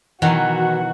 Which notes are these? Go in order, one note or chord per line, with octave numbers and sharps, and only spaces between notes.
B2 D#3 E3 F#3 F#4 F#5